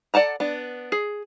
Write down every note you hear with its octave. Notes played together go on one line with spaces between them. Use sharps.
A4 D5 F#5 A5 A#5
B3 D4
G#4